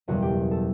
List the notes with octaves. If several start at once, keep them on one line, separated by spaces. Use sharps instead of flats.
F#1 E2 B2 G3 F#4
G4
A4